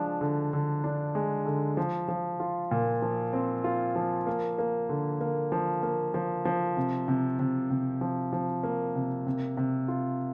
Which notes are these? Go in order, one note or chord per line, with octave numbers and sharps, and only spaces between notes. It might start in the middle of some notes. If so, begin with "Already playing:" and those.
Already playing: F3 G#3 D4
D3
D3
D4
G#3
D3
F3
F3
F4
A#2
F3
C4
F4
F3
A#3
A#3
D3
A#3
F3
A#3
F3
F3
C3
C3
C3
C3
F3
F3
A#3
C3
C3
C3
F4